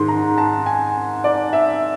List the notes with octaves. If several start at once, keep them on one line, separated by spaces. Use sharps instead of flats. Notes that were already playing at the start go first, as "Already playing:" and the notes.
Already playing: G#2 D#3 G#3 C6
A#5
A5
G#5
D5
E5